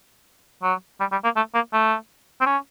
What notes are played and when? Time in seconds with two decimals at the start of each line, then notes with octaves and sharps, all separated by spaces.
0.63 F#3
1.00 G3
1.12 G3
1.24 A#3
1.36 A3
1.54 A#3
1.73 A3
2.41 C4
2.46 C#4